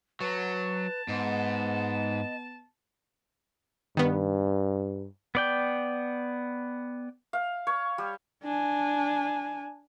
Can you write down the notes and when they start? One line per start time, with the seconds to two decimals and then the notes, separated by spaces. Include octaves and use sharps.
0.21 F#3 B4 A5
1.08 G#2 B3 D#5
3.97 G2 D#3 B3
5.35 B3 D5 G5
7.33 F5
7.67 C#5
7.98 G3
8.44 D4 G#5